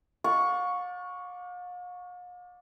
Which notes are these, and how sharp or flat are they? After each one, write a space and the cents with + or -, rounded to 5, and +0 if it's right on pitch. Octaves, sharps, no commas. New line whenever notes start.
D5 +0 F5 +45 C#6 +0